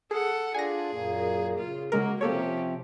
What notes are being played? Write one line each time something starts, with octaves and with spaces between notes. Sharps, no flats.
G#4 A4 F#5
D4 F4 G#4 D5 G#5 A#6
F#2 A#2 A#3
C#3 F4
C#3 G#3 A#3 F#4 A#4
C3 F3 A#3 C4 C#4 G4 A4 C#5